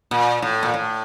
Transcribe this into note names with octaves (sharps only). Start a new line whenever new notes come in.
A#2
A2
A#2
A2